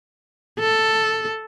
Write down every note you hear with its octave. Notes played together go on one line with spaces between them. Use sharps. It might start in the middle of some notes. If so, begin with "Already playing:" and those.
A4